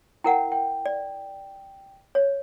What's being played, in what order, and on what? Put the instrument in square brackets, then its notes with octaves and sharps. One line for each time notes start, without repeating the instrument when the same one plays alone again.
[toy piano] E4 A#4 F#5 [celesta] G5
[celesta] G5
[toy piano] D5
C#5